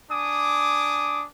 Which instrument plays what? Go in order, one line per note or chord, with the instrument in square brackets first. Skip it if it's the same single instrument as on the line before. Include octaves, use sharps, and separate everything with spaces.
[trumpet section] D4 G#5 D6 D#6